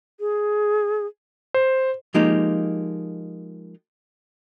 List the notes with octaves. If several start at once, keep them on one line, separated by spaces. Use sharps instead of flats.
G#4
C5
F3 G#3 A#3 D#4 G4